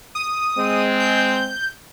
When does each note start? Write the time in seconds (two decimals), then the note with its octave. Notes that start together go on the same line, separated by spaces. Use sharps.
0.15 D#6
0.57 G#3 C4
1.00 G6